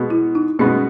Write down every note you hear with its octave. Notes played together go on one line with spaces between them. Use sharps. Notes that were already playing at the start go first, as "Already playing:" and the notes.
Already playing: B2 G#3 B3 F#4
E4
D#4
B2 G#3 B3 C#4 F#4